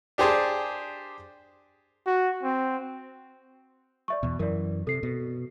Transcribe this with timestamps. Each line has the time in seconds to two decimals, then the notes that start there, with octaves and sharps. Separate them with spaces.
0.18 D4 G4 G#4 C5 A5
2.06 F#4
2.43 C4
4.08 D5 E5 C#6
4.23 E2 B2
4.39 F#2 E3 A#4 D5
4.87 C3 A4 C7
5.03 B2